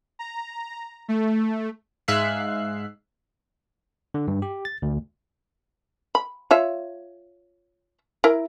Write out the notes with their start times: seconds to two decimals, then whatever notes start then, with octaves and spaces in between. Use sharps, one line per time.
0.19 A#5
1.08 A3
2.08 G#2 G#3 E5 F5 F#6 C7
4.14 D3
4.28 G2
4.42 G4
4.65 A6
4.82 D2
6.15 B5
6.51 F4 C#5 E5
8.24 E4 A#4